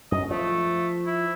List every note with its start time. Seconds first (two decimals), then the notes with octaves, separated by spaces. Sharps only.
0.12 F#2 D#5
0.31 F3 A3
1.06 E4